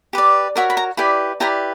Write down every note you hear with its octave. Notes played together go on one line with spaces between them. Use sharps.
G4 B4 D5
F#4 A#4 C#5 E5
B5
A#5
E4 G4 B4 D5 B5
E4 G4 B4 D5 A#5